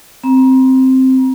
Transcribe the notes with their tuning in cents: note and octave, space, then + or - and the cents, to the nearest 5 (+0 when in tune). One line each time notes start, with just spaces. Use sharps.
C4 +0 A#5 +30